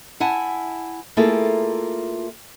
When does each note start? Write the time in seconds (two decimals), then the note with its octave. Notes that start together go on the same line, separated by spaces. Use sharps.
0.20 E4 F#5 G#5 A5
1.17 A3 A#3 E4 F4 G#4 A4